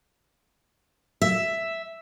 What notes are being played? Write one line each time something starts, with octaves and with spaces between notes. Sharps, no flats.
E5